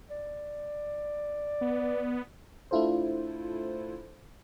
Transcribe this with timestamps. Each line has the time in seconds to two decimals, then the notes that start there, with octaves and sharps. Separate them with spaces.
0.10 D5
1.61 B3
2.71 A3 D4 E4 F4 A4 C5